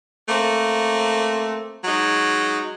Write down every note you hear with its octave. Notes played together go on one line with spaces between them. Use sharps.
A3 A#3 C4
F#3 G#3 D#4